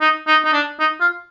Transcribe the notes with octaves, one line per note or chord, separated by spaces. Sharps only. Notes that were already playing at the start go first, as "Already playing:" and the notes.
D#4
D#4
D#4
D4
D#4
F4